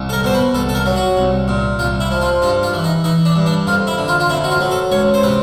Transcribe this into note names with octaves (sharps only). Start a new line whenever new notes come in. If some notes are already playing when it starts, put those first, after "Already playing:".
Already playing: C2
A4
A#4
B2 C5
B4
C2 A4
A4
A#4
F#3
F#4
C2
A#2
C2 F4
E4
F3
F4
G2 F4
F4
E3
D#4
E3 D#4
D4
G2
D4
F2 F4
E4
D3
F4
F4
F2 E4
F#4
F4
F#3
A4
C#2 C#5
C5
C3 B4